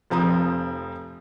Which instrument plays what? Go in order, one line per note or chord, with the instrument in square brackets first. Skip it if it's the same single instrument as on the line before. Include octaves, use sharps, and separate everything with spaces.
[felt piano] F1 F3 C4 A#5 D#6